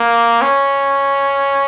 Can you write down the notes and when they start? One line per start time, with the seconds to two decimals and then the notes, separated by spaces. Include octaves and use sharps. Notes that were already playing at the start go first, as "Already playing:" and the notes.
Already playing: A#3
0.42 C#4